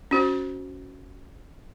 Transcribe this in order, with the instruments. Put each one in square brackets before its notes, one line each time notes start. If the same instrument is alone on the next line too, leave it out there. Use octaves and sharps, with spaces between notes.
[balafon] C#4 F#4 C5